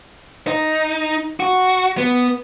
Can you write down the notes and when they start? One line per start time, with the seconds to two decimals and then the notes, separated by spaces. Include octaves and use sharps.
0.48 D#4
1.40 F#4
1.98 B3